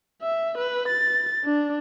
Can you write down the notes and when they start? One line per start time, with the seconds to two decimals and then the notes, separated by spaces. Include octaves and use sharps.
0.22 E5
0.58 B4
0.88 A6
1.45 D4